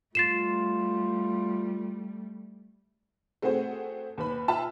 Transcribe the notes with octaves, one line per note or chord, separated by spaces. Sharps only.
G3 A3 F4 A6 C7 E7
A3 C4 F#4 G#4 C5
D#2 B4 B5
F4 E5 A5 B5 E6